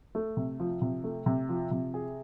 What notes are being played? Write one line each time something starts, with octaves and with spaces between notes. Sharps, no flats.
A3
C3
F3
C3
A3
C3
F3
C3
G#4